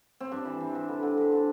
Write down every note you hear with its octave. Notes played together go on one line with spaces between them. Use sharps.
C4
G2 D4
E3
E3
G2
D3
D3
G2
D3